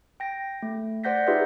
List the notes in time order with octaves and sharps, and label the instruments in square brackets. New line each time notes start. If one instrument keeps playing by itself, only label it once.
[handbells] G5 A#6
A3
C5 D5 F#5 G6 A#6 B6
D#4 F4 G4 G#4 B4 E5